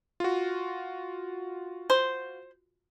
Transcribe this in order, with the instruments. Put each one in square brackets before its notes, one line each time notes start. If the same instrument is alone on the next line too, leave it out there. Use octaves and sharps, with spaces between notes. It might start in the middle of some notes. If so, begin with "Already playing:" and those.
[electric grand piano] F4 F#4
[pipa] C5